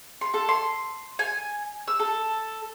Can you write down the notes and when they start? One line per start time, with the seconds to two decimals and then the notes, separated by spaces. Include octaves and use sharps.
0.21 C6
0.34 A4
0.49 C6
1.19 G#5
1.88 E6
1.99 A4